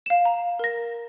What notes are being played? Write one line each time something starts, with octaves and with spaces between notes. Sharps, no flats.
F5 E7
A#5
A#4 A#6